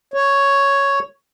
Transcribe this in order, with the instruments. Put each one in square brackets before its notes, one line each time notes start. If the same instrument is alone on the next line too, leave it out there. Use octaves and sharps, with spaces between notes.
[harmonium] C#5